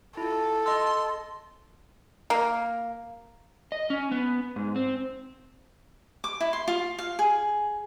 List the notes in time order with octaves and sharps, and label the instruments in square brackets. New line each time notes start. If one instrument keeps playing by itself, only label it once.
[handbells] E4 F4 [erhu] A4
[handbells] D#5 E6 [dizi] C6
[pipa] A#3
[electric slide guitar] D#5
C#4
B3
G#2
C4
[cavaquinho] D6
E4
C6
F4
F5
G#4